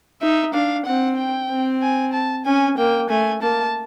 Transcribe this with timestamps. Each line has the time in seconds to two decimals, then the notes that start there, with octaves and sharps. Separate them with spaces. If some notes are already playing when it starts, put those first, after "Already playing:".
0.22 D#4 E5
0.54 D4 F5
0.86 C4 F#5
1.17 G5
1.50 C4
1.82 G#5
2.13 A5
2.46 C#4 G#5
2.77 A#3 G5
3.09 A3 G#5
3.42 A#3 A5